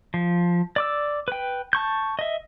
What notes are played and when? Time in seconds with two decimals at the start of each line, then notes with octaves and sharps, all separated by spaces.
0.14 F3
0.76 D5 D6 E6
1.28 B4 G5
1.73 A5 C#6 G6
2.19 D#5 E5